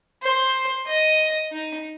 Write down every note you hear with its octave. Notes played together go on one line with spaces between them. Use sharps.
C5
D#5
D#4